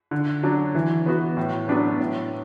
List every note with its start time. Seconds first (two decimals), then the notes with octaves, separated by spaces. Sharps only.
0.11 D3
0.43 F#3 D4
0.75 E3
1.06 B3 F#4
1.37 A2
1.68 F#3 B3 D4 B4
1.99 A2